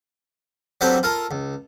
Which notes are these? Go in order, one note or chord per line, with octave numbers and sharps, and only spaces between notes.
F#3 G3 C4 D4 A4 B4
F4 A4 A#4
C#2